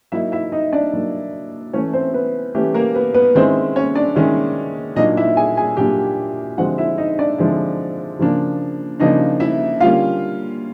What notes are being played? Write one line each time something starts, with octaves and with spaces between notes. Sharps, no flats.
F#3 A#3 D#4 E4 E5
E4 E5
D#4 D#5
D4 D5
F#3 A#3 D#4
E3 A3 C#4 C#5
C4 C5
B3 B4
E3 A3 C#4 G4
A#3 A#4
B3 B4
B3 B4
D#3 G#3 C4 C#4 E4 C5
C#4 C#5
D4 D5
D#3 G#3 C#4 E4
A#2 F#3 A#3 D4 D#4 D#5
E4 E5
G#4 G#5
G#4 G#5
A#2 F#3 A#3 D4 G4 G5
D3 F3 G#3 C4 E4 F#4 F#5
E4 E5
D#4 D#5
D4 D5
D3 F3 G#3 C4 E4
C#3 F3 A#3 D4
C#3 F3 A#3 D4 D#4 D#5
E4 E5
D3 G3 A#3 C#4 F4 F5